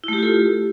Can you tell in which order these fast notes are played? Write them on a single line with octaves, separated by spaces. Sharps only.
E4 A3 G4 F4 A4